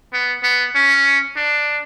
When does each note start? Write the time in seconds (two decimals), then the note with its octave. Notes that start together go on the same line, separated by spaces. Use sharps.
0.13 B3
0.43 B3
0.75 C#4
1.37 D4